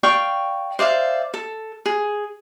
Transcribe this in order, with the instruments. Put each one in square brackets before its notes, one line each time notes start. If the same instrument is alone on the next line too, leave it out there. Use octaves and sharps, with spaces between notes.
[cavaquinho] D5 F5 G5 C#6
C5 D5 E5 F5
A4
G#4